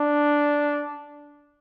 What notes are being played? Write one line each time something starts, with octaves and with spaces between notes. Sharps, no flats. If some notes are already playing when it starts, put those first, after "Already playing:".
Already playing: D4